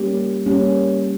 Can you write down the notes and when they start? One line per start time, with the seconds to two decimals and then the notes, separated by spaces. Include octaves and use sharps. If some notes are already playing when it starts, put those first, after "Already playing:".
Already playing: G3 A#3 C#4 G4
0.46 G3 A#3 C#4 G4